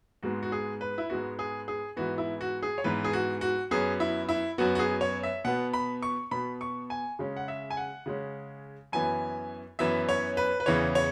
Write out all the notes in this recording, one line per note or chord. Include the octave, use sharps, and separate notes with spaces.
G#2 G#3 B3 F#4
F#4
G#4
B4
E4
G#2 G#3 B3 F#4
G#4
G#4
G#2 E3 B3 F#4
E4
F#4
G#4
C#5
G#2 E3 B3 B4
G#4
F#4
F#4
F#2 F#3 B3 G#4
E4
E4
F#2 F#3 B3 F#4
F#4
G#4
C#5
E5
B2 B3 F#5
B5
C#6
B2 B3 B5
C#6
G#5
C#3 G#3 C#4
F#5
E5
G#5
F#5
C#3 G#3 C#4
F#2 E3 B3 G#5
F#2 E3 B3 E5
C#5
B4
B4
E2 C#3 E3 C#5
C#5